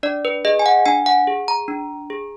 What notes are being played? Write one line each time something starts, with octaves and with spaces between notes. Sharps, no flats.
D4 D5
B4
G#4 D#5
G#5
F#5
D4 G#5
F#5
G#4
A#5
D4
G#4